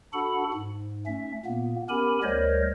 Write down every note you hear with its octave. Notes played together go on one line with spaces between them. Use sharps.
D4 F#4 A4 F#5 B5
G#2
A3 C#4 E5
A#2 A#3 B3
B3 C#4 G4 A#4 G#5 B5
D2 G3 A#4 C5 C#5 D#5